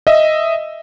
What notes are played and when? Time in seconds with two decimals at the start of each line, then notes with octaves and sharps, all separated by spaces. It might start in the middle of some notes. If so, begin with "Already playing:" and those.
0.07 D#5 E5